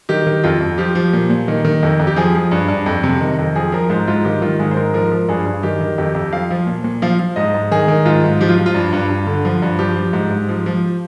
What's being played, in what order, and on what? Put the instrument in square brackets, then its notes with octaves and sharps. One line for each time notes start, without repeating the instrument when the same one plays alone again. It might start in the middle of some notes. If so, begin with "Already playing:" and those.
[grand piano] D#3 G4
D#3
F2 F4
F2
F3 G4
F3
A#2
A#2
D#3
D#3
F2
F2
G4
F3 G#4
F3
G2
G2
F2
C3
D#3
F2
F3 G#4
F3 A#4
G#2 C5
G#2 F4
D#3 G4
D#3 F4
G#2 G#4
C5
G#2 A#4
F3 A#4
F3
G2 G#4
G2
D#3 G4
D#3
F2 G4
F2
F3 F5
F3
A#2
A#2
F3 F5
F3
G#2 D#5
G#2
D#3 G#4
D#3
G#2 F4
G#2
F3 G4
F4
F3
F4
G2
G2
G2
D3
F3
G2
F3 G4
F3
G#2
G#2
F3
F3